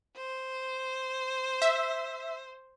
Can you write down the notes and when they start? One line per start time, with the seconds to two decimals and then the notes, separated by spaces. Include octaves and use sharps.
0.17 C5
1.62 E5